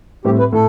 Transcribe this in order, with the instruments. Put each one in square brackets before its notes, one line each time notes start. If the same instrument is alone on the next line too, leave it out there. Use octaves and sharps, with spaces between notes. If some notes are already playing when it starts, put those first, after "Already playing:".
[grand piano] A2 G3 C4 [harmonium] G4
[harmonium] B4
[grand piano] A2 [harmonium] A4